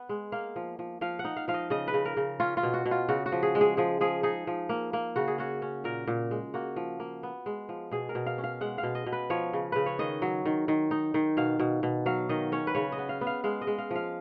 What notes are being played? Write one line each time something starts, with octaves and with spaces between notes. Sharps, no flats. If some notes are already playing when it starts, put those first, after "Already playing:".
Already playing: B3 F#5
G#3
A#3 F5
F3
F3
F3 F5
F#5
D#4
F5
F3 F5
D#5
C#3 D#5
B4
C#3
A#4
C#3
C#4 F4
F4
B2
F#4
B2
F4
C#3 F#4
F#4
F3
G#4
G#3
G#4
F3 G#4
F3 G#4
D#4 G#4
F3
A#3
A#3
C#3 F#4
G#4
C#4 F#4
C#4
A#2 A#4
A#2
G#3
A#3 F#4
F3
A#3
B3
G#3
F3
B2 G#4
A#4
B2
F5
C#4
F5
G#3 F#5
F5
B2
D#5
B2
B4
F3 C#5
C#3
C#3 B4
C#5
D#3 D#5
F#3
D#3
D#3
D#4
D#3
B2 F5
B2
B2
F#3 F5
D#3 D#5
C#4 C#5
B4
C#3 C#5
D#5
B3
F5
B3
F5
G#3 F5
D#5
G#3
F5
F3 F5